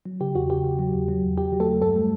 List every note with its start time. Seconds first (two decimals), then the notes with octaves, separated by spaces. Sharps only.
0.05 F#3
0.20 C#3 G4
0.35 E2 F#4
0.50 C#3 G4
0.64 C#3
0.79 F#3
0.94 E2
1.08 F#3
1.23 E2
1.38 F#3 G4
1.53 F#3
1.60 A3 A4
1.67 F#3
1.82 G2 A3 A4
1.96 G3